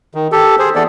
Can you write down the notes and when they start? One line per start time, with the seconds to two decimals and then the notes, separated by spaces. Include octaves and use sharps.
0.14 D#3
0.32 G4 A4
0.59 G#4 C5
0.76 E3 B3 A4 D5